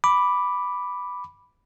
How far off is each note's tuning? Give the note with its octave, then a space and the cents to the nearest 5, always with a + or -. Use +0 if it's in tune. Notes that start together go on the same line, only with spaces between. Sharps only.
B5 +0 D6 +0